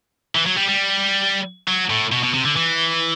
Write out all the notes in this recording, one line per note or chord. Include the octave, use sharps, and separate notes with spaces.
E3
F#3
G3
G3
F#3
A2
B2
B2
C3
D3
E3